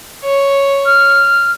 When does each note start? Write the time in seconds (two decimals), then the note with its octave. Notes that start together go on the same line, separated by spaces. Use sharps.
0.24 C#5
0.86 F6